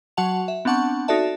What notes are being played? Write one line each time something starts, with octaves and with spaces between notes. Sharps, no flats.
F#3 F#4 F#5 A5 F7
E5
B3 C4 D4 F#5 A5 C#6
D#4 F#4 A4 D5 E5 A5